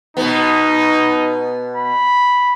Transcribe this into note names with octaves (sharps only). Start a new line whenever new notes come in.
B2 B3 D#4
B5